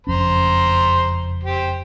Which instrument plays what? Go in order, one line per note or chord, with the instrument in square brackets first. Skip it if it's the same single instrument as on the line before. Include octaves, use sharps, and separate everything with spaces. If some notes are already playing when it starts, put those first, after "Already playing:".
[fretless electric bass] F#1 F2 C#4 [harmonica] C5 A#5 C6
[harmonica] G4 C5